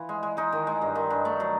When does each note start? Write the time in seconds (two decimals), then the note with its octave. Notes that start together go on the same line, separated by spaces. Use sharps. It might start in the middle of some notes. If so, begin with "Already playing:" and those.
Already playing: E3 F4
0.09 G#3
0.23 G#3
0.37 G#3 D#4
0.53 D#3
0.67 G#3
0.82 G2
0.95 D#3
1.10 G2
1.25 A3
1.40 F#3